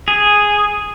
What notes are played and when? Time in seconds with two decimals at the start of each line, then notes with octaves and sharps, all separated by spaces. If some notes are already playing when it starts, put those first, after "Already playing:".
0.08 G#4